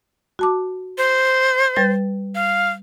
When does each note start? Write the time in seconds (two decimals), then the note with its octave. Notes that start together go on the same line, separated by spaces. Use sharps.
0.39 F#4 A5 D6
0.98 C5
1.76 G3 B4 A6
2.35 F5